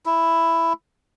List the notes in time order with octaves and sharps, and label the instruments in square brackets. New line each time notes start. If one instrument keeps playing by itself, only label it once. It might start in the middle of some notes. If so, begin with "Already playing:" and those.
[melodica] E4